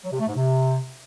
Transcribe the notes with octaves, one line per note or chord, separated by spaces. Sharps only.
F#3
C3
A3
G#2
C3